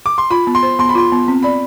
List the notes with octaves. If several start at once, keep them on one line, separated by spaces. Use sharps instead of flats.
D6
C6
F4 B5
B3
C6
C5
B3 C6
B5
F4 C6
B3
C4
D5 B5